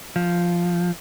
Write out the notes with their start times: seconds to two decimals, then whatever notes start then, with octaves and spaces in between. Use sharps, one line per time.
0.16 F3